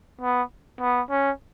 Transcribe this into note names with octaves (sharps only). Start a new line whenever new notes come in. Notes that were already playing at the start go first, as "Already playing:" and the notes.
B3
B3
C#4